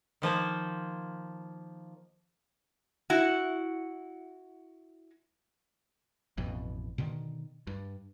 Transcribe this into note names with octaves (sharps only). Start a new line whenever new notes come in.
D#3 F3 A#3 C5
E4 F#4
A1 F2 B2
B2 D3 D#3
G2